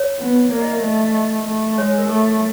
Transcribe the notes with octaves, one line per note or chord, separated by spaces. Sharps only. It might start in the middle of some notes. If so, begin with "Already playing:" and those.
Already playing: C#5
B3
A#3 D5
D#5
E5
A3 D#5
D#5
A3
G#3 C#5
A#4
A3 A4